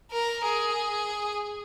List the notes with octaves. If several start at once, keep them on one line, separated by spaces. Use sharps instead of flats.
A#4
G#4